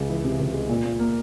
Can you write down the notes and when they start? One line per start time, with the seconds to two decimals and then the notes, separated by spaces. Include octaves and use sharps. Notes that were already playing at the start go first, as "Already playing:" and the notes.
Already playing: C#2 G#3
0.09 E3
0.24 C3
0.40 C#2
0.54 G#3
0.69 A#2
0.85 A#2
0.99 A#3